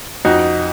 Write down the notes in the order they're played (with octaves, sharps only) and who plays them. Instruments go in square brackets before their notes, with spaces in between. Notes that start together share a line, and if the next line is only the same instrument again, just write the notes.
[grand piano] F2 D#4 F#4